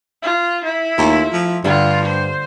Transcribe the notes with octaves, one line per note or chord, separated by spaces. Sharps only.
F4
E4
D#2 A3 F4 A#5
F3
G2 D3 G3 F4
C5